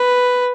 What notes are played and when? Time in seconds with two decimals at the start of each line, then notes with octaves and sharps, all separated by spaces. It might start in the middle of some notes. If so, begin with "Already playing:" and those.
Already playing: B4